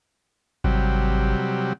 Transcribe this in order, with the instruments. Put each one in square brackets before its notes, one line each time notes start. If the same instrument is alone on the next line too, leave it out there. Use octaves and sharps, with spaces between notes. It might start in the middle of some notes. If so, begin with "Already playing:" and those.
[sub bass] G#1 [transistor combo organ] C3 F#3 G3